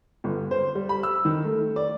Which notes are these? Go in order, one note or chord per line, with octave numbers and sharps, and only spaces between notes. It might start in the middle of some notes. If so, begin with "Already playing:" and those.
G1
C5
G3
B5
E6
D#3
A3
D5